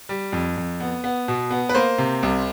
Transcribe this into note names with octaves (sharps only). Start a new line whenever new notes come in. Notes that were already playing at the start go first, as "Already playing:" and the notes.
G3
F2
F2
B3
B3
B2
B3
B4
A#3 C5
C3
C2